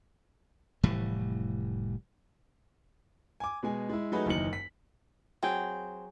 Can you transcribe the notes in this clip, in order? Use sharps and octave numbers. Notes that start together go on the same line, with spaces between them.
F1 A2 E3 G3
G#5 D6
B2 G#3 G#5
G#3 E4
F#3 A3 D#4 F#4 G#4 B4
F#1 D#2 E3 D#4 C#7 F#7
B6
F#3 C4 G#4 G5